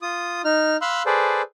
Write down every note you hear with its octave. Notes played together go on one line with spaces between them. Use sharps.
F4 D#6
D#4 F6
F5 B5 C6 E6 F#6
G#4 A4 B4 C5 D5